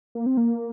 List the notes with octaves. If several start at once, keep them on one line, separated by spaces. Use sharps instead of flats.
A#3
C4
A#3